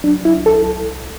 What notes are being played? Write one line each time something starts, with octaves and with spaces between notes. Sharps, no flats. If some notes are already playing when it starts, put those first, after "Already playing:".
F#3 D4
E4
C2
A4